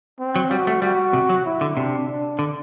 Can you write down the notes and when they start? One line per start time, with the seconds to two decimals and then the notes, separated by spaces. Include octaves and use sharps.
0.19 C4
0.36 F#3
0.51 G3 F#4
0.67 A3
0.82 G3 F#4
1.13 C3
1.29 F#3
1.45 E4
1.61 D3
1.77 C3 D4
2.08 D4
2.39 D3